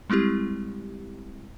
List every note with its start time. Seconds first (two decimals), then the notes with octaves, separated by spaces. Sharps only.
0.10 G3 G#3 C4 E4 G4